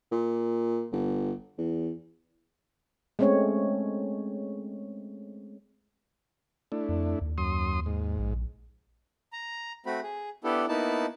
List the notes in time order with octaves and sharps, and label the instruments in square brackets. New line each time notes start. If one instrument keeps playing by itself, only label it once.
[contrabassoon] A#2
G1
E2
[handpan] G#3 A3 C4 C#4 C#5
[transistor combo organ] A3 D4 E4
[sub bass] F2
D#2
[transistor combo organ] F#2 C6 D#6
G#2
[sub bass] A#1
[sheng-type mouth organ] A#5
A3 C4 F#4 B5
G#4
B3 D4 E4 G4 A4
A#3 B3 D#4 E4 A5